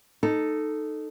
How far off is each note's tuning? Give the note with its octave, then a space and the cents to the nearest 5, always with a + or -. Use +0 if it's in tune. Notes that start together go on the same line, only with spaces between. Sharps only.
D#4 -10 A4 +0